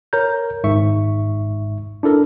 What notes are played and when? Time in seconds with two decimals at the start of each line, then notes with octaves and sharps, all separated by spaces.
0.13 A#4 C#5 A#5 G6
0.64 G#1 G#2 E5 C#6
2.03 D4 E4 A4 A#4